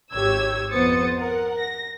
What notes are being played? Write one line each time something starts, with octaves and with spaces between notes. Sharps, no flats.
G#1 G4 C#5 E6 G#6
F2 B3 C5 D#6 A6 C#7
A#4 F#5
A#6